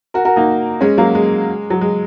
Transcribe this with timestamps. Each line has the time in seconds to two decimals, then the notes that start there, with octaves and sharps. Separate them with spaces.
0.14 F#4 A#4
0.25 F#4 A#4
0.36 A#3 D#4
0.81 G#3 C#4
0.98 F#3 A#3
1.15 G#3
1.70 F#3
1.81 G#3